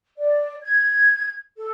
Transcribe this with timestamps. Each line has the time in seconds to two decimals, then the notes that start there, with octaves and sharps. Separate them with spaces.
0.17 D5
0.62 G#6
1.57 A4